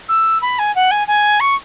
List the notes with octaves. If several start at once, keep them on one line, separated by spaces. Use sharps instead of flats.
E6
B5
G#5
F#5
G#5
G#5
C#6